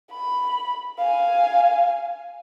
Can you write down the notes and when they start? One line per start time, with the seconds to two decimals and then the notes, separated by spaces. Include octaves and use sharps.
0.11 B5
0.98 F5 G#5